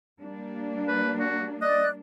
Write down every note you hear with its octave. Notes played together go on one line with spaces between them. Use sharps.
G3 A#3 D4
B4
F#4
D5 D#5 F#6